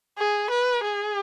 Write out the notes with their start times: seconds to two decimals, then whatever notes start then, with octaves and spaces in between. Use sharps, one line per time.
0.18 G#4
0.51 B4
0.84 G#4